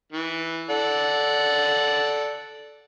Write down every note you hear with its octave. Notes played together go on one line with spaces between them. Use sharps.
E3
A4 D5 F#5